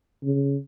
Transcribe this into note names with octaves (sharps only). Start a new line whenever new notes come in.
C#3